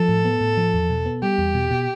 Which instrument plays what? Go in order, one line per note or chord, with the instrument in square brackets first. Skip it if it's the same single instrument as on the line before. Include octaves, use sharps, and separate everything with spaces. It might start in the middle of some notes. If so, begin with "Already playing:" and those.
Already playing: [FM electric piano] F3 [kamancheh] A4
[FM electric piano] A2
B3
A2
F3
E2
B2
B3
[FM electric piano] G3 [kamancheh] G4
[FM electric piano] E2
B2
B2